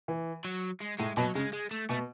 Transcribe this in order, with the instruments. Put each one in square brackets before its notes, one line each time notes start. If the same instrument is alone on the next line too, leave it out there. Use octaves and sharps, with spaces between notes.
[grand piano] E3
[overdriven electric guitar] F#3
G#3
[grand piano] A2 [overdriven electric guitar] G#3
[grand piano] B2 [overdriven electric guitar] F#3
[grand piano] C#3 [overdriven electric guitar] G#3
[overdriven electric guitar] G#3
A3
[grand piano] B2 [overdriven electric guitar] A3